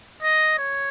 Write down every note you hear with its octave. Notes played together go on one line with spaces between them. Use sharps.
D#5
C#5